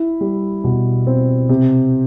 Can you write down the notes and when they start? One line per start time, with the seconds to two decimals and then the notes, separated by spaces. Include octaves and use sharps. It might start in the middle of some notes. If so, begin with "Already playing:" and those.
Already playing: E4
0.21 G3
0.64 B2
1.07 C4
1.49 C3